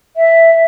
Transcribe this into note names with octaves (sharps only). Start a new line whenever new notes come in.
E5